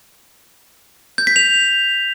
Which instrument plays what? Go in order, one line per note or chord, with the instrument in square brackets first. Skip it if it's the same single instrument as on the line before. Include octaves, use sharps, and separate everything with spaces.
[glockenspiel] G6
B6
F7